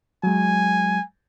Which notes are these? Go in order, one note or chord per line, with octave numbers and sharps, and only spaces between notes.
F#3 G#3 G#5